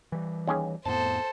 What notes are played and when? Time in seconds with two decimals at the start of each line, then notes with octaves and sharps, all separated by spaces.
0.12 E3 G3
0.47 D#2 C#4 G#4
0.85 F2 A2 B3 A4 C5 A5